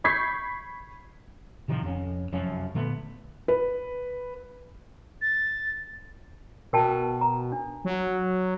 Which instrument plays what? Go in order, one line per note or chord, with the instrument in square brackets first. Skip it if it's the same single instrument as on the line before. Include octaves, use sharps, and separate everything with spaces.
[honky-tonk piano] B5 C#6 G6 G#6 B6 C7
[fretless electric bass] A2 C3 D#3 F3
F2 C4 C#4
F1 F#2 F3 C#4
A#2 D3 A3 B3
[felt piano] B4
[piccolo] A6
[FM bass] B2 [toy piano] A#4 G5 A5
[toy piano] A#5
D4
[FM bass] F#3